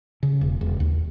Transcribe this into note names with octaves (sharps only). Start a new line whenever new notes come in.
C#3
E1
E1
D#2